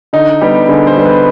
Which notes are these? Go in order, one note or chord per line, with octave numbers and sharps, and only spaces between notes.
D3 D#4
G3 B3 G4
D3 G#4
C5
G3 B3
B4